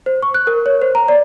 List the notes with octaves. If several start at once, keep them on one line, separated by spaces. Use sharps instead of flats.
C5
C#6
F#6
A#4
C#5
C5
A#5
D5